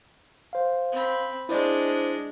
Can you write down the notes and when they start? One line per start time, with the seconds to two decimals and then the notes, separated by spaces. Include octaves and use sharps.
0.53 C5 F5
0.92 C4 B5
1.49 G#3 D4 E4 C5 D5